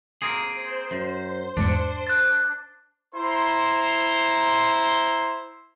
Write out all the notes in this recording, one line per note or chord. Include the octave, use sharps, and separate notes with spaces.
A#3 C4 G#4
C5
F#2
E2 G#2 D4 C#7
F#6 A6
E4 C5 A#5 C6